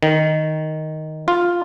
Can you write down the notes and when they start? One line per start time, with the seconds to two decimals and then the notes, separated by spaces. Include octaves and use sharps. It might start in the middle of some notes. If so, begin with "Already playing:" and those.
0.03 D#3
1.28 F4